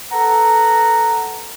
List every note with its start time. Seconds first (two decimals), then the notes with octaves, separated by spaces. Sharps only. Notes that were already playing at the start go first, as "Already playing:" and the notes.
0.12 A4 B4 F#5 A#5